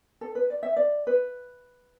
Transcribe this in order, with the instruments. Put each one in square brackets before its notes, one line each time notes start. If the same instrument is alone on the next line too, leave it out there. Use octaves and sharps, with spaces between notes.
[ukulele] A4
B4
D5
E5
D5
B4